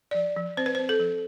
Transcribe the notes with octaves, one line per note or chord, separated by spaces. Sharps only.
F3 D5
F3
C4 C5
B4
C4 C5
A4
F3